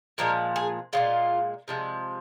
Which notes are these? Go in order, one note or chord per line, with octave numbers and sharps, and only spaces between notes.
A#2 F3 G#3 A#4
G#4
A#2 F3 G#3 F4
C3 F3 G#3